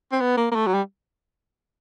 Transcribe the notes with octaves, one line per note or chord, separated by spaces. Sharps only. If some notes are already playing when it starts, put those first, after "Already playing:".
C4
B3
A#3
A#3
A3
F#3
G3